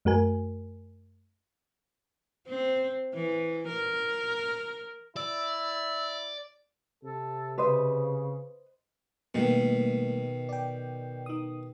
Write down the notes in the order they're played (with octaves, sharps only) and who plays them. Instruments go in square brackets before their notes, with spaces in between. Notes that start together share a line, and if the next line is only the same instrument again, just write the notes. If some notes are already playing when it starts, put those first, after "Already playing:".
[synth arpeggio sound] F#2 A3 F#4 A#4 G#5
[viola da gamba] C4
E3
A#4
[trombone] E4 [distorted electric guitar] D5 [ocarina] E6
[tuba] C3 [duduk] A4
[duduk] C#3 [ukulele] B4 C5 D#5
[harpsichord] B2 D#3 [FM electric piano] G3 A3 A#3
[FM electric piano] D5 G5
D#4 D#6